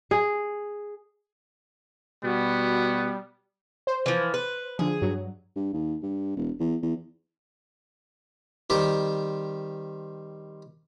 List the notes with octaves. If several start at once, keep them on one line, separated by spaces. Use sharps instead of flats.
G#4
B2 G3 B3 F#4
C5
E3 F3
B4
D3 F3 G#4
G2 F#3
G2
D#2
G2
E1
E2
E2
D#3 G3 C4 G4